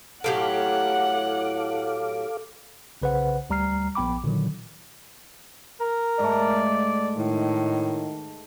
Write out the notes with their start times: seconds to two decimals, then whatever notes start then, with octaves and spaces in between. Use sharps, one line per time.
0.24 A2 F#3 G4 A4 F5 F#5 D6
3.02 B1 C#3 B4 C5 F#5
3.50 D2 G3 A#5 F6 C7
3.95 A#1 B3 G5 B5 D6
4.24 A#2 D3 D#3 F#3
5.81 A#4
6.19 G#2 A3 D5
7.18 A2 D#3